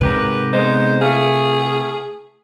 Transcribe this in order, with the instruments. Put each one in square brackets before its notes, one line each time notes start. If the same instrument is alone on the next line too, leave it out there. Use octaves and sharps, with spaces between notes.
[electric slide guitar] G#2 G4 A#4 [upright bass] C3 [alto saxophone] B4
[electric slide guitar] G#3 B3 D#4 [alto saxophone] C5
[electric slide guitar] A3 F5 [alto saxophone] G#4